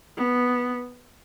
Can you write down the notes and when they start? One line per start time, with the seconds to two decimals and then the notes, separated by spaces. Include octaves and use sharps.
0.17 B3